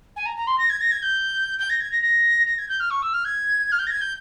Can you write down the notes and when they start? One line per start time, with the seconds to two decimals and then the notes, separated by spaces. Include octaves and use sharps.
0.16 G#5
0.25 A#5
0.36 A#5
0.47 C6
0.58 A#6
0.69 G#6
0.81 A#6
0.91 G#6
1.02 G6
1.58 G6
1.69 A#6
1.80 G#6
1.91 A#6
2.02 A#6
2.46 A#6
2.58 G#6
2.68 G6
2.80 F6
2.90 C#6
3.02 E6
3.13 F6
3.24 G#6
3.72 F6
3.79 G6
3.86 A#6
3.90 G#6
4.01 G6